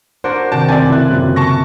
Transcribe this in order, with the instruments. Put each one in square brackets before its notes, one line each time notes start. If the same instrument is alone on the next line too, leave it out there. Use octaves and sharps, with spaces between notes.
[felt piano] D4 [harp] F#4 A#4 D5 [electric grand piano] C5
[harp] C3 G4 [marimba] D#3 [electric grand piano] A5
[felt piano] F#1 A5 A6 [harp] A3 C4 [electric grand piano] D5 G#5
[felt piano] E4 E5 F#6
F#2 A#2 C#3
[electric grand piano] A5 C#6 A#6